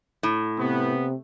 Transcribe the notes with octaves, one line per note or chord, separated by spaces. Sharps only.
A2
C3 B3